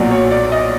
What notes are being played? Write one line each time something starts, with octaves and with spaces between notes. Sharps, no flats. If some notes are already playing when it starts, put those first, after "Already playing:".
Already playing: B1 A#2 F#3 D5
C#5
D5
D#5